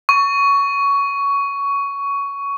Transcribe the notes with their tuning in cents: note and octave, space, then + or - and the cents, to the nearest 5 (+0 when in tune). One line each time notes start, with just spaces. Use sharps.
C#6 +15